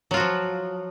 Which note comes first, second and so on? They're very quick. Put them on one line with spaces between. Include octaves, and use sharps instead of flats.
F#3 F4 F#4 F3